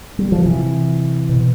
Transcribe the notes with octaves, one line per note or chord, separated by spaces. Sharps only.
G3
F3
C3 E3
B2